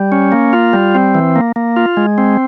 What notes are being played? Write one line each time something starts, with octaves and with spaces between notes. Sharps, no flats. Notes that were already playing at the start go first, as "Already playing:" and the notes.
Already playing: G3
C#4
A#3
F4
G3
C4
E3
A#3
A#3
F4
G#3
C4